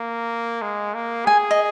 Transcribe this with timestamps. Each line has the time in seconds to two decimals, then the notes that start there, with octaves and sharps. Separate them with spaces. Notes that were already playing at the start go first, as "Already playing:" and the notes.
Already playing: A#3
0.62 G#3
0.95 A#3
1.26 G#4 G#5
1.51 D#5